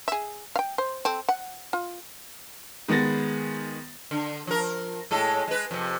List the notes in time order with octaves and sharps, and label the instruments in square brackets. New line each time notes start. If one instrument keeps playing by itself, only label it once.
[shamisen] G#4 E5
F5 G5
C5
C4 A4
F#5
F4
[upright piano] D#3 G#3 B3 A6 A#6
[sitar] D3
F3 A#4
A2 G#3 A4
G#3 B4
F2 C3